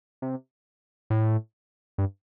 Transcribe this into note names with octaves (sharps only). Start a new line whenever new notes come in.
C3
A2
G2